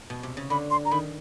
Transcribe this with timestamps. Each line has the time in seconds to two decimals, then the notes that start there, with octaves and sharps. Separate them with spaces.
0.10 B2
0.23 C3
0.37 C#3
0.50 D3 B5
0.71 C6
0.85 A#5
0.91 D#3 B5